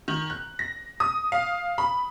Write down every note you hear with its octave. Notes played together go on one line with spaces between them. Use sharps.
D#3
F#6
A#6
D#6
F5
B5